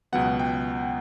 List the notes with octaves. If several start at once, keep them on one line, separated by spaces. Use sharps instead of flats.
C#2 B2 F#3 B3 F#5
G5